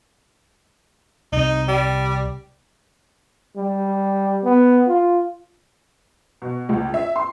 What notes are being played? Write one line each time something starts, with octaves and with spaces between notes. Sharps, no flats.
C2 C3 D#4
G3
G3
B3
F4
B2
C#2
E5
C6